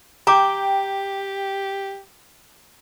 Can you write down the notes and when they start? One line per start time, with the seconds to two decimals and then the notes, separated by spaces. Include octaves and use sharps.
0.27 G4 G5 A#5 D6